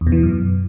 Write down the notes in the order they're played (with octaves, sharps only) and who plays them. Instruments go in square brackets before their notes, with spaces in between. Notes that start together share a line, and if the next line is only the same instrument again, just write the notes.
[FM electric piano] E2
B2
E3
B2
F#2